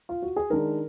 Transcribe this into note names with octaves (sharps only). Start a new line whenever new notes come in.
F4
F#4
G#4
D#3 G#3 D4 A#4